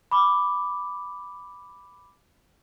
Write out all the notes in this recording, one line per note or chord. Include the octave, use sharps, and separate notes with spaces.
B5 D6